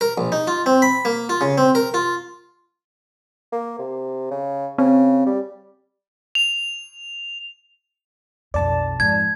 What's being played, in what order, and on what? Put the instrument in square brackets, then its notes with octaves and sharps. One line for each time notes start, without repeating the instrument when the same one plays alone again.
[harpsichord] A#4
A#1
D#4
F4
C4
B5
A#3
F4
C#3
C4
A#4
F4
[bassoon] A#3
C3
C#3
[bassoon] C#3 [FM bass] C4
[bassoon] G3
[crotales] F7
[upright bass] B1 F2 [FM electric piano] D5 A5
[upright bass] F2 G#2 [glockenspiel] G#6